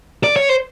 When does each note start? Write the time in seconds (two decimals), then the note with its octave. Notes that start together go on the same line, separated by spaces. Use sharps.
0.24 D5
0.36 C#5
0.49 C5